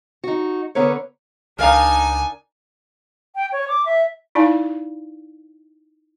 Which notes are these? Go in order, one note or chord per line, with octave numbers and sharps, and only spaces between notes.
D#4 F#4
D3 B3 A#4 B4 C#5
C#2 D4 D#4 A#4 F5 G#5 A#5
G5
C#5
D6
E5
D#4 E4 D5 F5 A5